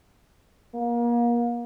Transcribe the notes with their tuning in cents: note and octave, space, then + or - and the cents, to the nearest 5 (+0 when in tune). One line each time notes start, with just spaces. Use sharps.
A#3 +30